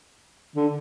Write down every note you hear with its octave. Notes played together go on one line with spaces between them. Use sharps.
D3